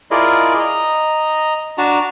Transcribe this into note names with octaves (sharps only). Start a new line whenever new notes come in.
E4 F4 G#4 A#4 D5 D#5
D#5 A#5
D4 F#4 A5 A#5